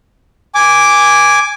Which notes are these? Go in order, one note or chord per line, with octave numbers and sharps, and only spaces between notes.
G#5 D6